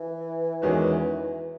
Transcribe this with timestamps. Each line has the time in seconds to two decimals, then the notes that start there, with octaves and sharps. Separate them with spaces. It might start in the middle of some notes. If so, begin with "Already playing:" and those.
Already playing: E3
0.62 E2 D#3 G#3 C#4 F#4